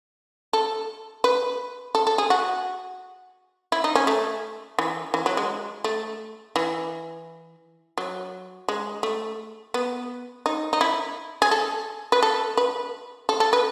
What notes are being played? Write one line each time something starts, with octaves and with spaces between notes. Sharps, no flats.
A4
B4
A4
A4
G#4
F#4
E4
D#4
C#4
A3
E3
E3
F#3
G#3
A3
E3
F#3
G#3
A3
B3
D#4
D#4
E4
G#4
A4
B4
A4
B4
A4
A4
B4